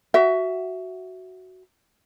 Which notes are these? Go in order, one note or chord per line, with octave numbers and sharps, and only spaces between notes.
F#4 E5